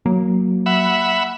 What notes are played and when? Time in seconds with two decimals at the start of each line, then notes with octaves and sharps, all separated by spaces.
0.06 F#3 A#3
0.66 E5 F#5 B5